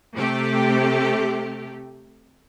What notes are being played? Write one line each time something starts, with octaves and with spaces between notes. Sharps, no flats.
C3 A3 G4